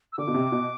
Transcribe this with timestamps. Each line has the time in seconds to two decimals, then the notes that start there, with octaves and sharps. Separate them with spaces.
0.13 E6
0.18 D3 D6
0.27 B2
0.34 C3
0.52 B2